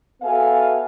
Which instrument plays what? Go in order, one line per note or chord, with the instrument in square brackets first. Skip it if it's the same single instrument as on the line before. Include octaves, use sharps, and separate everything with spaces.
[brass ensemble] B3 F#4 A4 E5 F5 G#5